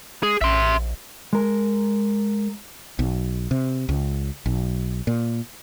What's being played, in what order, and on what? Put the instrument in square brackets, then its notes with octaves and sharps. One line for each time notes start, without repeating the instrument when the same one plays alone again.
[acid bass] G#3 [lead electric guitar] G#4
[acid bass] A#1 [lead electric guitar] E5 C6
[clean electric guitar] G#3 A#4
[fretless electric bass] B1
C3
C#2
B1
A#2